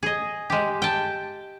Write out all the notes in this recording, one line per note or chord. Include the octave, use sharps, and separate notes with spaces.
G#4 D#5
G#3 G4
G5 A5